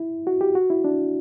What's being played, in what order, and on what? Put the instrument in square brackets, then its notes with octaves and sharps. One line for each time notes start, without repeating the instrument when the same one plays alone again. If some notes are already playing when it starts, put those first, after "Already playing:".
Already playing: [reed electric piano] E4
F#4
G4
F#4
E4
D4